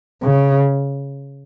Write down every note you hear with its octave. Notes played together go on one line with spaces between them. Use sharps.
C#3